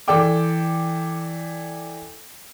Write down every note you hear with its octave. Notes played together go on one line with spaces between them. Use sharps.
E3 A4 D5 G5 D6